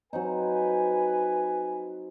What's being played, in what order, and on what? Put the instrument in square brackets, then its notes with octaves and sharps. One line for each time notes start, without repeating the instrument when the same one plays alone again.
[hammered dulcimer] F#3 C4 D#4 [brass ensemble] B4 G#5